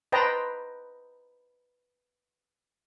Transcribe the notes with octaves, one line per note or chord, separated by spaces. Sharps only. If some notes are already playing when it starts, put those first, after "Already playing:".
B4 C5 D#5 G5 A5 A#5